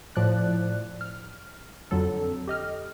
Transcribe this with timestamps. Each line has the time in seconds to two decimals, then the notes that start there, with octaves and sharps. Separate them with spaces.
0.16 A2 F3 D5 F#6
1.01 F6
1.91 F2 D3 F#3 A4
2.47 G4 D#5 F6